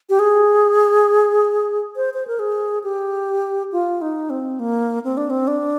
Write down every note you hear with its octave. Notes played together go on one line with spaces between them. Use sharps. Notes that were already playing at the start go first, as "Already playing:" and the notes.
G4
G#4
C5
C5
A#4
G#4
G4
F4
D#4
C4
A#3
C4
D4
C4
D4